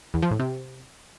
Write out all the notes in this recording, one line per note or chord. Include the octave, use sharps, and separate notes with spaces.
E2
F3
A2
C3